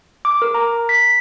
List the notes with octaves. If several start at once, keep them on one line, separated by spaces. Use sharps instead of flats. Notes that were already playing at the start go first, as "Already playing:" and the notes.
D6
A#4
A#5
B6